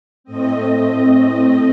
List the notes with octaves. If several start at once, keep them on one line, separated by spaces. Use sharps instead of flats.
A2 A3 C4 D#5